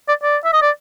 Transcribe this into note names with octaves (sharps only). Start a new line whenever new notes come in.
D5
D5
E5
D#5
D5